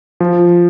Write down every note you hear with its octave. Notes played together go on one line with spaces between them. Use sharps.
F3